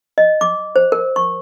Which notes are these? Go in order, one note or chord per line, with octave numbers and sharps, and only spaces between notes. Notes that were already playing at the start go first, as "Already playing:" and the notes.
D#5
D6
C5
A#4
C#6